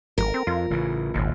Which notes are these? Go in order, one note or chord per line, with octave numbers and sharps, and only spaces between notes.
G#1 A#4
C4
F2 F4
A1 C#3 E3
G#1 D#2 A#2